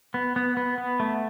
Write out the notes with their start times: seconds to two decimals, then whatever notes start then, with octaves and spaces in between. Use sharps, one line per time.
0.14 B3
0.36 B3
0.57 B3
0.78 B3
1.00 A3